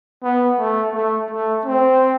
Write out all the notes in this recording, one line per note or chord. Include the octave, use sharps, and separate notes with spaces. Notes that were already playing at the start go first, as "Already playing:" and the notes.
B3
A3
A3
A3
C4